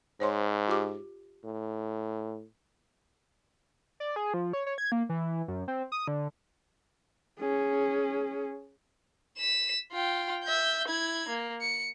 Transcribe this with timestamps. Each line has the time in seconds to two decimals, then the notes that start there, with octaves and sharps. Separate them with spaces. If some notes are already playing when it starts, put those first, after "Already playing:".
0.20 G#2 C5 C#5 C6
0.68 F4 G4 D6
1.44 A2
4.00 D5
4.16 G#4
4.34 F3
4.53 C#5
4.66 C#5
4.78 G#6
4.92 A#3
5.09 E3
5.48 F#2
5.68 C4
5.92 D#6
6.08 D3
7.39 C#4 G#4
9.38 B6 E7
9.92 F4 G5
10.44 E5 G6
10.88 E4 G#6
11.29 A#3
11.61 C#7